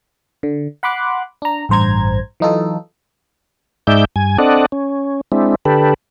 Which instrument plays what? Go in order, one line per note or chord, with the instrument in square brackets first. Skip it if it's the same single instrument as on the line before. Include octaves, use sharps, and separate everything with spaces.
[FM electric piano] D3
F#5 B5 C6 D6 F#6
D4 A#5
A1 G2 C5 A#5 G#6
E3 F#3 D#4 F4 A4
[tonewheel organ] G#2 G#3 D#4 D5 E5 G6
G2 G#5
C4 D4 A4 D5 D#5 F#5
C#4
G#3 C4 D4 E4
D3 G4 A4 B4